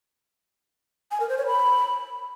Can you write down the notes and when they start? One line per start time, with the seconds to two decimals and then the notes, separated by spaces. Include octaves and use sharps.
1.11 G#5
1.20 A#4
1.29 C5
1.38 C#5
1.47 B5